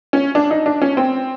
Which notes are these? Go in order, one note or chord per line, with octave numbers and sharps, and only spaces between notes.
C#4
D4
D#4
D4
C#4
C4